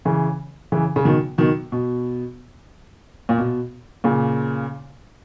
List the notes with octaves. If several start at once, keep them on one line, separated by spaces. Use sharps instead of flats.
C#3 E3
C#3 E3
C#3
B2 D#3
B2 D#3
B2
A#2
B2
A#2 C#3